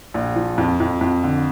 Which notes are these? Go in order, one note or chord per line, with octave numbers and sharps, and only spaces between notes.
A#1
F3
F2
F2
F2
D3